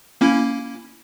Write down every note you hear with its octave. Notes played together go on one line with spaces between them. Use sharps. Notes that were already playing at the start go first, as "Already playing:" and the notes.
A#3 C#4 E4